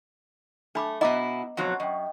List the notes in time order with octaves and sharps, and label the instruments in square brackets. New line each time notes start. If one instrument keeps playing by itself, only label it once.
[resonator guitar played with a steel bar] A3 [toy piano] D4 B5 D6
[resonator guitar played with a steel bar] B2 E4 [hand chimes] B3 F#5 [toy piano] D#5 A#5 D6
[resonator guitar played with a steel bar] F2 B2 F#3 [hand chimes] F#5 C#6
[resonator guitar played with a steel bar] F#2 [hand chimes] D#5 G5